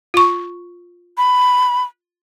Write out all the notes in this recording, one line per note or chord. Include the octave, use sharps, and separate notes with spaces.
F4 C#6
B5